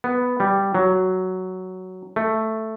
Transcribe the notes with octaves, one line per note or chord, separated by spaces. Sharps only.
B3
G3
F#3
A3